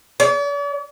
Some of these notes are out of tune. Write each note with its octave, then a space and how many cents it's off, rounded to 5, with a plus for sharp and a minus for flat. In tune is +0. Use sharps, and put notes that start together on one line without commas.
D5 -45